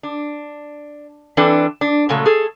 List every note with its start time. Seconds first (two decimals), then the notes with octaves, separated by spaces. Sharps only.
0.03 D4
1.37 E3 C4 D4 A4 B4
1.81 D4
2.09 A#2 C#3 F#3 G#3 A3
2.26 G#4 A4